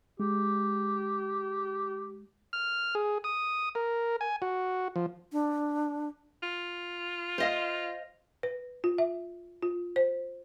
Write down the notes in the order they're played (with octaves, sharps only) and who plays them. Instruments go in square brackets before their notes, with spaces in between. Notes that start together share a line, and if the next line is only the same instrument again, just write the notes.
[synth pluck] G#3 [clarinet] G4
[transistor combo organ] F6
G#4
D#6
A#4
G#5
F#4
F3
[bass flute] D4
[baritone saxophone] F4
[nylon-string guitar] C5 D#5 F5
[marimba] B4
F4
E5
F4
C5